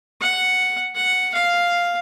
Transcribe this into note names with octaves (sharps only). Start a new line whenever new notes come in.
F#5
F#5
F5